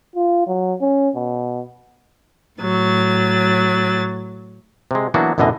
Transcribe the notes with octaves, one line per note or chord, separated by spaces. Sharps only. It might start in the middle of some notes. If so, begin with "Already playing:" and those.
F4
F#3
C#4
B2
A2 F#3 A6
C3 G#3
E3 F#3 A#3 B3 D4 F#4
A1 F#2 B2 D3 E3 D#5